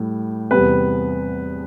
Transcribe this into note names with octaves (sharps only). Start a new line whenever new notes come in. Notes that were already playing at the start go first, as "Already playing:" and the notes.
Already playing: A2 G3
E2 C3 G3 B3 B4